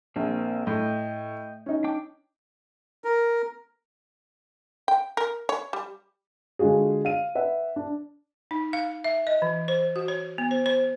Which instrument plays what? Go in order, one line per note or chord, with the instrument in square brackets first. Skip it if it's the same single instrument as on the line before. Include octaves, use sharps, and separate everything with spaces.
[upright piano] A#1 [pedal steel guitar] A#3 C4
[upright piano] A2 [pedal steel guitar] D#5 G5
[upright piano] C#4 D#4
[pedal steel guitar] D4 G5 D6
[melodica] A#4
[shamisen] G5
A#4
C#5
G3
[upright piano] D3 G#3 F4 F#4 G#4
F5 D#7
B4 E5 F#5
D4
[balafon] D#4
F5
E5
D#5
E3
C5
F#4
C#5
B3
C5
C5